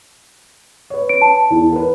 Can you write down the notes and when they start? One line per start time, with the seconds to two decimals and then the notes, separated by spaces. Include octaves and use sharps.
0.90 B4 C#5
1.09 D7
1.22 A5
1.51 E2 E3
1.72 A#4 B4